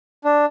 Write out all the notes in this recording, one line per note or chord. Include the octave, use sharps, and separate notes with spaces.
D4